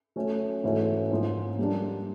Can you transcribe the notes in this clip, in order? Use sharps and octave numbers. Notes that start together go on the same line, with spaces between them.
F#3 A3 C#4
G#2 E3 A3 C#4 F#4
G#2 F3 A#3 C#4 F4
G3 A#3 D4